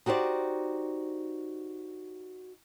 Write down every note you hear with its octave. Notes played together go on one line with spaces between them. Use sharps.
D#4 F#4 G4 C5 D5